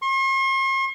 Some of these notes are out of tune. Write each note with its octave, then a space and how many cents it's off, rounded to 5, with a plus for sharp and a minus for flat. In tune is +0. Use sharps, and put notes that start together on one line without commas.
C6 +45